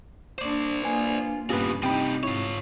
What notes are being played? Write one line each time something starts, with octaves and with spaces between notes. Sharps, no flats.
A#3 D4 C5 D5
A#3 D4 F4 B4 G#5
G2 A#2 C#3 B3 C#4 F4 G4 B4
A2 C3 D#4 G4 G5 B5
G#2 E4 F4 C#5